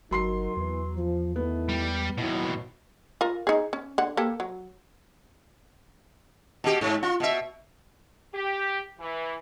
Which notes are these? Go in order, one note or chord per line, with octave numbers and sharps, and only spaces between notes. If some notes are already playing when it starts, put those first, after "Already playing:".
G1 F#3 D#4 F#4 A#4 C6 C7
E2 E3 B3
F3
D#3 A3 B3 E4
G3
D#2 B2 F#3 E4
F4 A#4
D#4 G#4
C#4
D3 F#5
A#3 G4 A4
F#3
B2 G4
G#2
F4
B2 E5
G4
E3